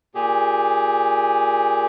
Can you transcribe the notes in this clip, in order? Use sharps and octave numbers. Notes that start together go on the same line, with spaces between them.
A#2 G4 G#4